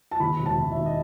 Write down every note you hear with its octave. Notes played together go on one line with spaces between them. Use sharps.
A5
D#2 B5
E1
A5
E1
E5
D#3
D#5